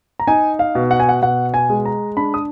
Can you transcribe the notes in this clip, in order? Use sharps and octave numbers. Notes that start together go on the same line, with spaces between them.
A#5
D#4 G#5
F5
B2
F#5
G#5
F#5
B2 F#5
G#5
G#3
A#5
D4 B5
D#6